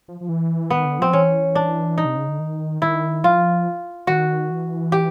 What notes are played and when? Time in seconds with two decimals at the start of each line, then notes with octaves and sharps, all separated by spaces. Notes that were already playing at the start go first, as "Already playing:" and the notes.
0.08 F3
0.21 F3
0.29 E3
0.70 D#3 B3
0.85 D3
0.99 F3 C4
1.13 E3 C#4
1.55 D4
1.98 D#4
2.05 C3
2.16 C#3
2.29 D3
2.40 D#3
2.82 D#3 E4
3.24 F3 F4
4.07 D#3 F#4
4.50 E3
4.92 G4